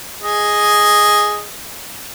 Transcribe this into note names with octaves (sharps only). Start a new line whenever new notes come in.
G#4 D#5